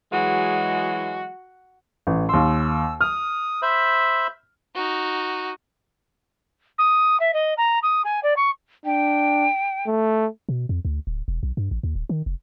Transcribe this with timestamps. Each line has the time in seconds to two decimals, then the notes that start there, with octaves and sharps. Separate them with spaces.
0.12 E3 F#3 G#3 F#4
2.07 A1
2.29 D#2 C6 E6
3.01 D#6 F6
3.62 C5 E5 B5
4.75 D#4 F#4
6.78 D#6
7.20 E5
7.34 D#5
7.58 A#5
7.83 D#6
8.05 G#5
8.23 D5
8.37 C#6
8.86 D4 G5
9.87 A3
10.49 B2
10.69 F2
10.85 D2
11.07 D1
11.28 E1
11.43 B1
11.57 G2
11.71 A1
11.83 D#2
11.96 D1
12.09 D#3
12.26 F1